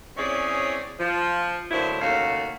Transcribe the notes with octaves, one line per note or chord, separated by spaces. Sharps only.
C4 C#4 E4 G#4 C#5 D5
F3
A2 D3 F#3 A#3 E4 C5
D#2 C#3 A3 F#4 F5